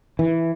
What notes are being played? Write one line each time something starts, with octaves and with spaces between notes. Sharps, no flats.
E3